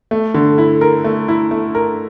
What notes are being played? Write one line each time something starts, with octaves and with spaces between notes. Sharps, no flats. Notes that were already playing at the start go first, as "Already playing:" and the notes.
A3
D3
E4
A#4
A3
E4
A3
A#4